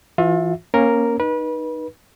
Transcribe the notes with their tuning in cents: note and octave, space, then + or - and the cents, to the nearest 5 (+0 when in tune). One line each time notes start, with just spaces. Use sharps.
E3 +20 F4 +35 E5 +0
A#3 +0 C#4 -20 A#4 +0
D#4 -10 B4 -30